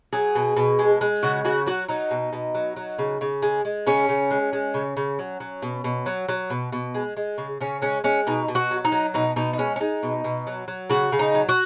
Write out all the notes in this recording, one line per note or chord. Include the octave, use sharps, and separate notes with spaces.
F#3 G#4
B2
B2
G#3
G#3
C#3 F#4
C#3 F#4
F#3 F#4
F#3 D#4
B2
B2
F#3
F#3
C#3
C#3
G#3
G#3
C#3 C#4
C#3
G#3
G#3
C#3
C#3
F#3
F#3
B2
B2
F#3
F#3
B2
B2
G#3
G#3
C#3
C#3 C#4
G#3 C#4
G#3 C#4
B2 D#4
B2
F#4
F#3
D#4
F#3
B2 D#4
B2 D#4
D#4
G#3 C#4
C#4
G#3 D#4
B2
B2
F#3
F#3
C#3 F#4
C#3
D#4
F#3
F#4